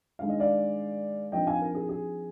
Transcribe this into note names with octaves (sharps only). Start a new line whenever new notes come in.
G2 D#3 G#3 D#4 F5
D#5
D5 F5
G2 F3 C4 D#4 D#5 G5
F5 G#5
A#4
G#4
G#4